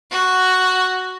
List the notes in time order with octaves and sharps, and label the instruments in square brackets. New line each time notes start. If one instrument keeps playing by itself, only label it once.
[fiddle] F#4